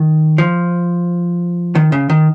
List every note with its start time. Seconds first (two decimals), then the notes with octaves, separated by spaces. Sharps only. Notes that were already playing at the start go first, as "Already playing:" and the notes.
Already playing: D#3
0.38 F3
1.75 D#3
1.92 C#3
2.10 D#3